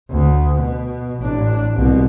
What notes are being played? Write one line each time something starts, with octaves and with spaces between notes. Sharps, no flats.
D2
B2
A1 D4
C2 B2